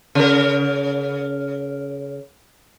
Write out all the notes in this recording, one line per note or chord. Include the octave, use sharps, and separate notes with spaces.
C#3 A#4